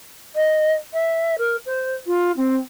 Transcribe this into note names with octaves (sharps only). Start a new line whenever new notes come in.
D#5
E5
A#4
C5
F4
C4